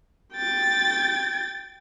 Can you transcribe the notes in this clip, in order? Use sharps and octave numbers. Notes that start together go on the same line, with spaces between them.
G5 A6